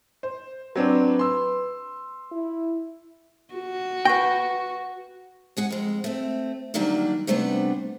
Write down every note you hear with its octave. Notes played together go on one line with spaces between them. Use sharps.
C5
F#3 C4 D4 B4
C6 E6
E4
F#4
B4 F#5 G5 C#6 A#6
G#3 G#4 F#5
F2 G#3
A3 C4
D3 D#3 F#3 G3 A#3 D4
C3 G3 A3 B3 D4